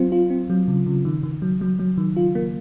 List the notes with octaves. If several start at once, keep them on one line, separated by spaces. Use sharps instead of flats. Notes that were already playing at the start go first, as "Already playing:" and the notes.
Already playing: F#3 C4 F4
F4
C4
F#3
C#3
C#3
D#3
D#3
F#3
F#3
F#3
D#3
F4
A#3